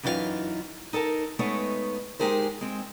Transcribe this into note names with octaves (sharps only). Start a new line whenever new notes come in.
F#2 E3 D#4 F4 A#4 F5
D#4 A4 A#4 A5
G#3 A3 B3 D#4 C#5
G#3 D#4 G4 G#4 A#4 C5
G#3 C4